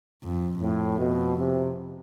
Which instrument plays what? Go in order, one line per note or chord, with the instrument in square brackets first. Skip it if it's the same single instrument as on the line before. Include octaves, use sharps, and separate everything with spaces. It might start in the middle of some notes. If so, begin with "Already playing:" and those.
[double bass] F2
[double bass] F2 [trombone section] A2
[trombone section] B2
C3